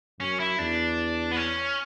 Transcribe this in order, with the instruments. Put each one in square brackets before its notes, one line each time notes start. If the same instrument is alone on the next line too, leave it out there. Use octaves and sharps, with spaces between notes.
[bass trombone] F#2 [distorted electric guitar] C#4
[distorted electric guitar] E4
[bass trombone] E2 [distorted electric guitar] D4
[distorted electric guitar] B3
C#4